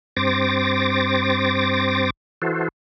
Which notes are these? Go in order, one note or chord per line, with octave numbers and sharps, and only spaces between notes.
G2 C4 C5 D6 A6 A#6
E3 F#4 A4 C5